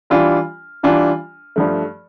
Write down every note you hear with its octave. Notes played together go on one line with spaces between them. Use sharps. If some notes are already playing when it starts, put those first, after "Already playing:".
E3 G3 D4 F4
E3 G3 D4 F4
G2 F3 A3